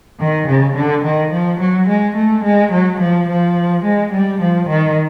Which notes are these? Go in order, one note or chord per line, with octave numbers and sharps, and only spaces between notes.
D#3
C#3
D3
D#3
F3
F#3
G#3
A3
G#3
F#3
F3
F3
G#3
G3
F3
D#3